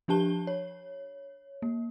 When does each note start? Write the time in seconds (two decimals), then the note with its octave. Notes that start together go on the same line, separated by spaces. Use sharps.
0.08 F3 D4 G4 A5 G7
0.47 C#5
1.62 A#3